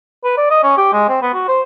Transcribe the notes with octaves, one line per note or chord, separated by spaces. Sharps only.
B4
D5
D#5
C#4
G4
G#3
C4
B3
F#4
C5